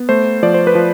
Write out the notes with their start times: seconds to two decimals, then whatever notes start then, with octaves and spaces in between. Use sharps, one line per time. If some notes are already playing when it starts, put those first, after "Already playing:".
Already playing: B3
0.09 A3 C5
0.43 F3 D5
0.54 C5
0.67 B4
0.75 F3